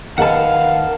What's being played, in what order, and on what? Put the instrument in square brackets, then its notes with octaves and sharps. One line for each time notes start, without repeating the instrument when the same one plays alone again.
[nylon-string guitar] D#3 A#4 B4 [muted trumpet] F5 [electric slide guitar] F#5 A5